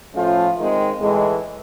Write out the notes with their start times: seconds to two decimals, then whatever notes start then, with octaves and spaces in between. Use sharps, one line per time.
0.14 A2 F3 A3 C#4 F4
0.57 D#3 G#3 C4
1.00 A2 E3 G#3